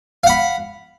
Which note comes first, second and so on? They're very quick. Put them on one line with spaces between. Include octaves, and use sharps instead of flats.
F5 F#5 B5